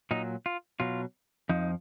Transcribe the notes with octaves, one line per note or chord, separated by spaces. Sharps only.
A#2 F#3 D#4
F4
B2 F#3 F4
F2 F3 D#4